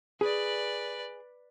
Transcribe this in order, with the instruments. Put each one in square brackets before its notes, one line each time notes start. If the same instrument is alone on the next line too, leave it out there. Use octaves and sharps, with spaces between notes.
[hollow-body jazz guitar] G#4 [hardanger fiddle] B4 D5